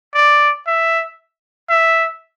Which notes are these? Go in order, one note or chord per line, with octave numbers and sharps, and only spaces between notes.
D5
E5
E5